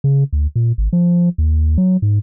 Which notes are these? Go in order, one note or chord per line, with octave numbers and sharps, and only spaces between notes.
C#3
D2
A#2
G#1
F3
D#2
F#3
G#2